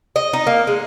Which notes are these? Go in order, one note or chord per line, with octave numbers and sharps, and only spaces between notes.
D#5
D#4
A#3
G#3